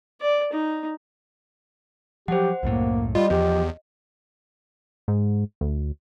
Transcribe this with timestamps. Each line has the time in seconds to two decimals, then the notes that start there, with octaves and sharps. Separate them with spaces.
0.21 D5
0.53 D#4
2.28 F3 F#3 G4 C5 F#5
2.63 C2 F#2 A2 A#3
3.15 G3 F4 D#5
3.30 E2 F3 G4
5.08 G#2
5.61 D2